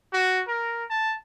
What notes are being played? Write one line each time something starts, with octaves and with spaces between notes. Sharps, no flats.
F#4
A#4
A5